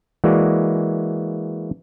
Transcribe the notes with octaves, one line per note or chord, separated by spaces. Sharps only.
E3 G#3 A#3 F#4 D5